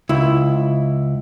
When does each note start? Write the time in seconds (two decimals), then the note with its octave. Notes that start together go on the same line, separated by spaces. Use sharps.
0.09 C#2 E4